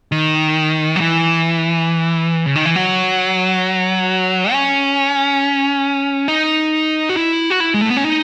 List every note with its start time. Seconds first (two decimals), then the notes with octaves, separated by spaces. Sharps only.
0.12 D#3
0.96 F#3
1.01 E3
2.46 C#3
2.55 D#3
2.66 E3
2.76 F#3
4.52 C#4
6.28 D#4
7.09 F#4
7.17 E4
7.50 F#4
7.60 E4
7.74 G#3
7.81 A3
7.90 B3
7.97 C#4
8.04 D#4